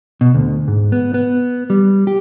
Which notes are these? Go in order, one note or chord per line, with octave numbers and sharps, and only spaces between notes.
B2
D2
G#2
B3
B3
G3
G4